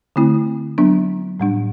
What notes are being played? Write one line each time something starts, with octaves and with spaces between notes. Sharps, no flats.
D3 A3 C4 E4
F#3 B3 D4
A2 G3 D4